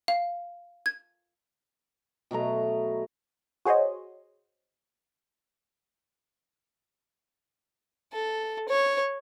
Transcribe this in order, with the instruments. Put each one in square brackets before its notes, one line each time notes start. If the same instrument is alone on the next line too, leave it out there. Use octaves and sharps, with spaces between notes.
[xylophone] F5
G#6
[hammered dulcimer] B2 F#3 A3 A#5
[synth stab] F#4 G#4 C5 C#5 D#5
[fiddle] A4
C#5